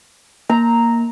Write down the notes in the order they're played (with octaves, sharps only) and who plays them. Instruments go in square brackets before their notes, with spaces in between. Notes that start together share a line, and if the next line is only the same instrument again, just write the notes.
[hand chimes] A#3 [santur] A#5